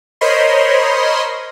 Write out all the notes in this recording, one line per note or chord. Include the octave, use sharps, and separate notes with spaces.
A#4 C5 C#5 D#5 B5 C6